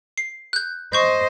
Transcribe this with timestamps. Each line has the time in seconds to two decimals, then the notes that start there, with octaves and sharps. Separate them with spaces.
0.18 C7
0.53 F#6 G6
0.93 C5 D#5 C#6 G6